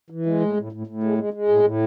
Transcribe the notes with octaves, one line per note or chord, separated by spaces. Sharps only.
E3
G#3
A2
A2
A2
A2
G#3
G#3
G#3
A2
A2